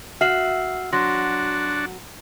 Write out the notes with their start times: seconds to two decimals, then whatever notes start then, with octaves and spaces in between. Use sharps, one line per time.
0.21 F#4 E5 F6 C7 F#7
0.93 F#3 D4 F#4 C6 A#6